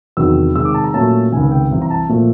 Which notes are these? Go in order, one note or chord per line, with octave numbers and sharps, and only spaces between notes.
E2 C3 D#3 F#3 E6
C3 D#3 G#3 E6
D6
A5
A#5
A#2 F#3 A3 C#4 A5
C#2 C3 D#3 G#5
G5
C2 C3 E3
A#5
A5
A#2 F3 A3